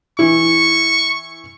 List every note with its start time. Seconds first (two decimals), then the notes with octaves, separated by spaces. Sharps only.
0.19 E3 E4 C#6